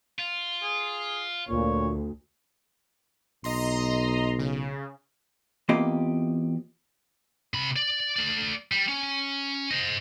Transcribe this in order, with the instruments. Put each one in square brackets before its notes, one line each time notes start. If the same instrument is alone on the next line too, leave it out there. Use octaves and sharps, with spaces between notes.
[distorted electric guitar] F4
[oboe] G#4
[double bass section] D2 [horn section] A#2 [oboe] C#5
[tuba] B1 [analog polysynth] D#5 A#5 C6
[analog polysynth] C#3
[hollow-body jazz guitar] E2 A#3 C4 F4 G4 D#5
[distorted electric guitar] C3 B5
D5
A3 D5
G3
C#4
C5 D#5